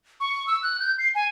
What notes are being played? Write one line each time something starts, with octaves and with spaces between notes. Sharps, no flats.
C#6
E6
F#6
G6
C7
G#5